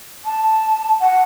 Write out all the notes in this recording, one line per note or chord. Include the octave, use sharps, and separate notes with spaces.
A5
F#5